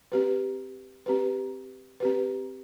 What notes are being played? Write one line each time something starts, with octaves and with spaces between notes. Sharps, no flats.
C4 G4 B4
C4 G4 B4
C4 G4 B4